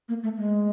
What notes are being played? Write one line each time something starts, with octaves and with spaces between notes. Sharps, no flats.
A#3
A3
G#3